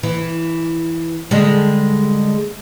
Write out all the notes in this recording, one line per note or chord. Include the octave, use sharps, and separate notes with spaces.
E3
D3 G3 G#3